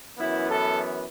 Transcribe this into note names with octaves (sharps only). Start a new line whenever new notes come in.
F#2 E3 B3 E4
A4